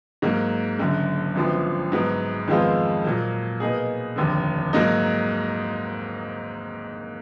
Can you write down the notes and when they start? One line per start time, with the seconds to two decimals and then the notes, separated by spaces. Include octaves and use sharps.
0.22 G#2 F#3 A#3
0.79 F#1 F#2 D3
1.35 G#1 F#2 D3 F3 B3
1.92 G#2 F#3 B3
2.48 F2 D#3 G#3 B3 F4
3.04 A#2 F#3 A#3
3.60 B2 A#3 D#4 G#4
4.16 F1 D#2 D3
4.73 G#2 F#3 A#3 D#4